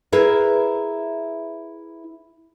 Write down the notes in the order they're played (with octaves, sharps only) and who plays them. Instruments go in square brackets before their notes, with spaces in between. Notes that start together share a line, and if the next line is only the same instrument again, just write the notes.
[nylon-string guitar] E4 G#4 A#4 B4 E5